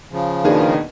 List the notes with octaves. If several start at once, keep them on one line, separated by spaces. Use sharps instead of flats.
C#3 F3
B2 D#3 A#3 D4 G#4